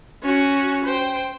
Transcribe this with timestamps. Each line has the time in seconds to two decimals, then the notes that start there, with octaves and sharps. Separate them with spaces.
0.23 C#4 F#4
0.85 C5 G5